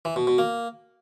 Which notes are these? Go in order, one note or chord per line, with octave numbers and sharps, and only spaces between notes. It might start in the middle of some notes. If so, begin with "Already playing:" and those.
E3
B2
B2
A#3